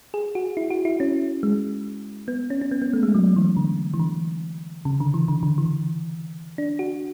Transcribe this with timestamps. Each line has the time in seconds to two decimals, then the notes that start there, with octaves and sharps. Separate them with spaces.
0.14 G#4
0.35 F#4
0.57 E4
0.70 F#4
0.85 E4
1.00 C#4
1.43 G#3
2.28 B3
2.50 C#4
2.61 C#4
2.71 B3
2.82 B3
2.93 A3
3.03 G#3
3.15 F#3
3.36 E3
3.57 D3
3.94 E3
3.99 D3
4.85 C#3
5.00 D3
5.14 E3
5.28 D3
5.43 D3
5.58 E3
6.58 D4
6.79 F#4